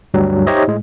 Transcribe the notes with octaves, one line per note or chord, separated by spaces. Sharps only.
D2 G2 F#3 G3
D#4 G4 C5 C#5 D#5 E5
A2 G#3